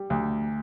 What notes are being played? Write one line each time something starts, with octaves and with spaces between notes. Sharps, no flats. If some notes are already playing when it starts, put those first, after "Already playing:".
Already playing: G3
D2